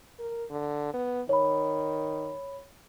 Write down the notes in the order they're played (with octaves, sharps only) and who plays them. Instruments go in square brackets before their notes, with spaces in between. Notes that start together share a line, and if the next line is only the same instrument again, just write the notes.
[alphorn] A#4
D3
B3
[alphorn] D#3 [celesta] C#5 B5